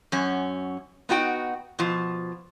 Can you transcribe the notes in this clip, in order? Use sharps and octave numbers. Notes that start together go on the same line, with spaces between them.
F#2 C#4
B3 D#4 F#4 G5
B2 F3